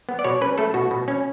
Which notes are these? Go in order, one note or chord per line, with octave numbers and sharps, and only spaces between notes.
B3
D5
B2 C#5
C#4 B4
A3 A4
B2 F#4
B2
C#4